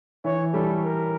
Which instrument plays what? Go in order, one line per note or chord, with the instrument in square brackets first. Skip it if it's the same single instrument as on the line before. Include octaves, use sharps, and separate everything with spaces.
[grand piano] E3 E4 [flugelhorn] C#5
[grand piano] G3 G4 [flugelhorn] A4
[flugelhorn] A#4